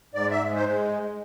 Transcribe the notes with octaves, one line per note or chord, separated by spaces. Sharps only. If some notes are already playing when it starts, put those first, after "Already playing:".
G#2 D5
E5
G#3
C5